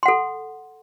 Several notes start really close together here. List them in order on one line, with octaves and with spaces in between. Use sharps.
C6 F#5 A4